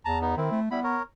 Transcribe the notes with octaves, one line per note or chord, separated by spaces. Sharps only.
E2 A5 A#5
B3 D#4
D#3 C4 E4
A3
G3 B3 E4 B5
A#4 C#5